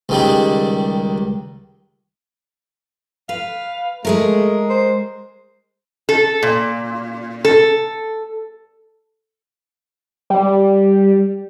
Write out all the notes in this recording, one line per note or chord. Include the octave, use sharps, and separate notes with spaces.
C#2 D#3 G3
B4 F5
G#3 A3 G#4 A#4
C5
A4
A#2
A4
G3